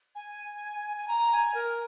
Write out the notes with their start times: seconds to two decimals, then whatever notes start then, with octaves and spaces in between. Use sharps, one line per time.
0.15 G#5
0.97 G#5
1.08 A#5
1.32 G#5
1.54 A#4